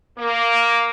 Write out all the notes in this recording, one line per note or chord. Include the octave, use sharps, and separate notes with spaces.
A#3